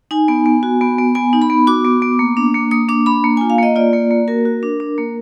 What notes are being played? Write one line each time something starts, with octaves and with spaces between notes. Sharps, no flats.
D#4 G#5
B3
B3
F#4
B3
B3
B3 G#5
D#4
B5
B3
F#4 D6
B3
B3
A#3
D4
A#3
A#3 D#6
D4 D6
D4 B5
A#3
F4 G#5
F5
A#3 D#5
F4 D5
A#3
A#3
F#4 A#4
F#4
D4
D4
A#3